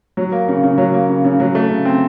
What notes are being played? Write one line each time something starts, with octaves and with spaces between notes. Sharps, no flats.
F#3
A#3
C#3
C#3
F#3
A#3
C#3
C#3
F#3
A3
C#3
C4